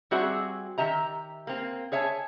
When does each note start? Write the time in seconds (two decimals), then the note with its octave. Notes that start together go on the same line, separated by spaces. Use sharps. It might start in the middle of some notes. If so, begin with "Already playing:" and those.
0.11 G3 C4 F#4 G#4 E5
0.78 D#3 G4 E5 A#5
1.47 A#3 C4
1.92 G#4 C#5 E5 G#5 A5